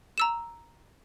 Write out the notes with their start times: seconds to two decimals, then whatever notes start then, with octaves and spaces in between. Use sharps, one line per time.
0.18 A#5 E6 E7